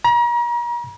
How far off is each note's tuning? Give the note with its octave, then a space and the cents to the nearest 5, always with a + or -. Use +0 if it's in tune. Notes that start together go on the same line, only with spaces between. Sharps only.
A#5 +40